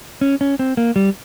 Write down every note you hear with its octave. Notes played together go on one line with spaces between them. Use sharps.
C#4
C#4
C4
A#3
G3